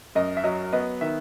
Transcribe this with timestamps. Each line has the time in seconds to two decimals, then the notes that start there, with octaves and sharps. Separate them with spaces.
0.15 F#2 D#5
0.37 E5
0.44 F#3 D#5
0.73 B3 D#5
1.01 D#3 E5